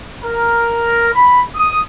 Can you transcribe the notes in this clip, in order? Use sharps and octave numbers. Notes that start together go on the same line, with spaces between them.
A#4
B5
D#6